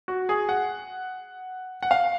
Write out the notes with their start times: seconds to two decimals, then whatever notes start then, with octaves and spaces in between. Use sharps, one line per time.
0.08 F#4
0.29 G#4
0.49 F#5
1.83 F#5
1.91 F5